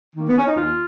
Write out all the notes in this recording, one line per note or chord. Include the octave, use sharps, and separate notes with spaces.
D#3 A#3
B3
C#4
D#4
D#2 F4